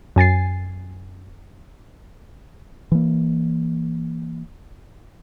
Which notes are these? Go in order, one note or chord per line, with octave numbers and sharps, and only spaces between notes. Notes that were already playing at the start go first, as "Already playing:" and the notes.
F#2 G#5 A6 C7
E3 A#3